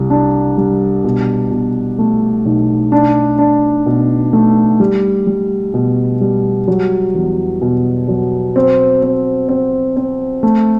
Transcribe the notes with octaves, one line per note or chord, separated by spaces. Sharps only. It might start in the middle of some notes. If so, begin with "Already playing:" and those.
Already playing: C2 G3
D4
G3
B2
B2
A3
B1
D4
D4
B2
A3
G3
G3
B2
G3
F#3
E2
B2
F#3
C4
C4
C4
C4
A3